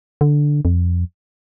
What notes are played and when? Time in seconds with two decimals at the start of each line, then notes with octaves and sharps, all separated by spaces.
0.21 D3
0.65 F2